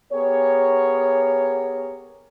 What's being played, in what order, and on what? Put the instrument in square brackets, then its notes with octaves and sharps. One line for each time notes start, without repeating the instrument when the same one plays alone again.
[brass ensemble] B3 G4 G#4 A#4 C#5